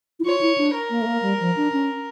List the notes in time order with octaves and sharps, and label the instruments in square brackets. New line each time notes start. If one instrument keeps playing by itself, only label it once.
[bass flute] E4
[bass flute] F4 [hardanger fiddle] C#5
[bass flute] E4
D4
[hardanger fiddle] A#4
[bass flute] A#3
A3
A#3
G3
F3
D4
C#4